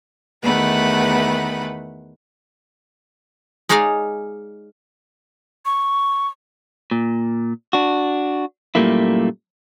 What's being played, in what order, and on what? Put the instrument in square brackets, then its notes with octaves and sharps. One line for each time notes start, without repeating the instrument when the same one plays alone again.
[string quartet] E2 D#3 A3 B4 F#5 B5
[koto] G#3 D#4 G#4 C#5 D5 F5
[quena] C#6
[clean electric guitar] A#2
D4 F#4
F#2 A#2 G3 A3 A#3 E4